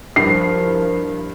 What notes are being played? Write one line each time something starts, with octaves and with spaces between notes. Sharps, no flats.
G2 F3 E4 A#4 C7